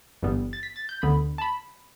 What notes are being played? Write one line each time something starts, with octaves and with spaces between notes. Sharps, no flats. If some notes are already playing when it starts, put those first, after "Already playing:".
G1 G2 E3 G3 B3
A6
B6
A6
G6
D2 D3 B3 B5
A5
B5